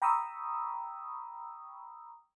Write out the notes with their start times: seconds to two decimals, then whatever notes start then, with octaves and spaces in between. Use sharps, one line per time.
0.02 G5 A#5 B5 C#6 D#6 E6